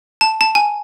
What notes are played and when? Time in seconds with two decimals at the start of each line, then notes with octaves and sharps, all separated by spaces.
0.21 A5
0.41 A5
0.55 G#5